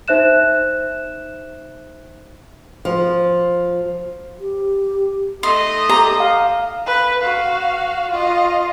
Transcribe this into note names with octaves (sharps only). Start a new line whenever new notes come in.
D#4 C5 E5 F#6 E7
F3
G4
A3 D#4 D#5 C6
G4 A#5
F5
B4
F#4 F5
F4 D#5